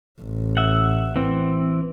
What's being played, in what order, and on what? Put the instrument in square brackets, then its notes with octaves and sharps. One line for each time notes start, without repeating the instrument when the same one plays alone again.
[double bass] A1
[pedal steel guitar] E5 F#5
E3 C4